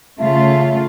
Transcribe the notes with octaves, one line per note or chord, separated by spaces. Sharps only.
C#3 A3 F4 E5